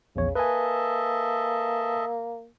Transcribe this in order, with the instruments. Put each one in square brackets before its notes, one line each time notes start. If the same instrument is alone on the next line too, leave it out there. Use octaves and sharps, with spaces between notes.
[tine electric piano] A#1 E2 C#5 [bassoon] C#3
[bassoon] A#3 [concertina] A4 D#5 E5 [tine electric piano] B4 G#5